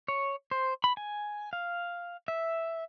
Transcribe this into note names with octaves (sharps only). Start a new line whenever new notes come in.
C#5
C5
B5
G#5
F5
E5